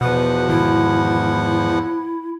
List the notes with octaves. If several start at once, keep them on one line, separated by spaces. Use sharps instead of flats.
E2 B2 F3 B4 F#5
G#2 D#3 E4